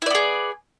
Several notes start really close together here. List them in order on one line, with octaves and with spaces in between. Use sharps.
E4 D5 B3 G#4